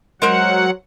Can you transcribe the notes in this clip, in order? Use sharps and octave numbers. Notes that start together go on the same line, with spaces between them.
F#3 G#3 A#4 C5 F#5